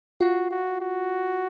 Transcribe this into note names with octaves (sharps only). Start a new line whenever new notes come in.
F4 F#4
F#4
F#4